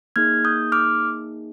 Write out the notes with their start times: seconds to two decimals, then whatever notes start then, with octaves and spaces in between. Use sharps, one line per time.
0.16 A#3 D#4 G#4 F6 G#6
0.45 D#6 G6
0.72 D6 F6